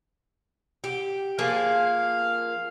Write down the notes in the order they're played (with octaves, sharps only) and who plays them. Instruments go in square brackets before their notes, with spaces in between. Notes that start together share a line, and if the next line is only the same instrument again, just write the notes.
[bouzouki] G4
[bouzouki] F3 A#3 G#4 [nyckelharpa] F5